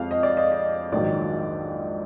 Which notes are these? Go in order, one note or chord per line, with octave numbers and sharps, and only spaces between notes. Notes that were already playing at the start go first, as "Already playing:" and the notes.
Already playing: F2 F3 G#3 F5
D#5
D5
D#5
D#5
A#1 G#2 D#3 F#3 D5